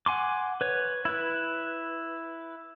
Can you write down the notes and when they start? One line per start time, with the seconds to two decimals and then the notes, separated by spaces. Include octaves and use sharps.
0.06 F#5 G#5 C6 D6
0.61 B4 C#5
1.05 E4 B4